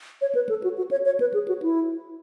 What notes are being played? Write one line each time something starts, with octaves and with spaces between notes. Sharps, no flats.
C#5
B4
A4
F#4
F#4
C#5
C#5
B4
G#4
F#4
E4